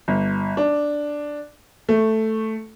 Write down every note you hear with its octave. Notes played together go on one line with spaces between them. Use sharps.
G1
D4
A3